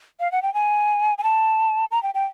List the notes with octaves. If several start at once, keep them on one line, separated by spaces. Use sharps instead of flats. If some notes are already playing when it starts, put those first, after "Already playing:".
F5
F#5
G5
G#5
G#5
A5
A#5
G5
G5